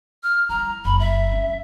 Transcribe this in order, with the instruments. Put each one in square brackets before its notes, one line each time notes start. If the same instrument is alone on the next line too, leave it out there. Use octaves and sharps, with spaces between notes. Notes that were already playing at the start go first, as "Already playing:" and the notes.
[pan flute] F6
[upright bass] G3 E4 [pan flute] A#5
[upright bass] F#1 [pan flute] B5
[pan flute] E5
[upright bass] G3 C#4